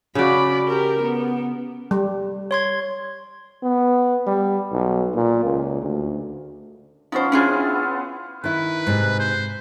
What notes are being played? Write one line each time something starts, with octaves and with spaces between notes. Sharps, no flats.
C#3 F#4 D5 B5
G4 A#4
B3
G3
C#5 C6 G#6
B3
G3
B1
A#2
C#2
D2
F3 B3 C#4 D#4 C5
B3 C#4 D4 E4 F4 G#4
D#3 E4 B4
G#2 C3
C5